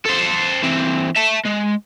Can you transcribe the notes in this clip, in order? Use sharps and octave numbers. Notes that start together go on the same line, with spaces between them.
A4 C5
E3 C4
E5 A5
G#3